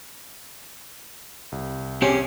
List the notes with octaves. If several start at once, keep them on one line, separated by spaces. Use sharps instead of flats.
C2
C4 C#4 G4 G#4